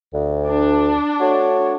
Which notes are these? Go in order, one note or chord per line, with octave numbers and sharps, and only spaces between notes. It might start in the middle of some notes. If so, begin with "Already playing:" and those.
D2
D4
A3 F#4 C#5